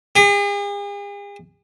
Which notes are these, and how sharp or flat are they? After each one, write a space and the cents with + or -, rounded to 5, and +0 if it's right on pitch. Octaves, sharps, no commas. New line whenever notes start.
G#4 -45